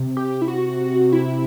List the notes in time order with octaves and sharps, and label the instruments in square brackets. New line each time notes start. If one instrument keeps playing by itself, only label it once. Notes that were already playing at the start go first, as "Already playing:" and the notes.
Already playing: [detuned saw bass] C3
[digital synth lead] G4
E4
F#4
E4